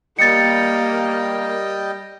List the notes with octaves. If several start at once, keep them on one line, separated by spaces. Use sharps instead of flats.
G3 A#3 D#5 G5 A6 C#7